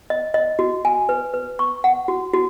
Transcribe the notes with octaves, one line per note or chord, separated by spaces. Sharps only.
D#5
D#5
F#4
G#5
B4
B4
C#6
F#5
F#4
F#4